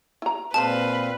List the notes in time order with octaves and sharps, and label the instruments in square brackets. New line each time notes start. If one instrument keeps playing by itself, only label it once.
[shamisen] E4 A#5
[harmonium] A#2 C4 F5 [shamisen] G#3 C5 [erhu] B4 [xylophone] A5